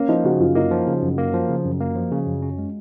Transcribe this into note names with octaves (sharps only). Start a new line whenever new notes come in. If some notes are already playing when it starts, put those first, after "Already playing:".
Already playing: A#3 C#4
F3 D#4
C#3 F#4
F#2 F4
A#3 D#4
F3
C#3
F#2
A#3
F3
C#3
F#2
A#3
F3
C#3
F#2
C#4
G#3